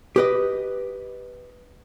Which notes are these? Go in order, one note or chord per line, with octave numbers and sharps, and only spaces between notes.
G4 B4 D#5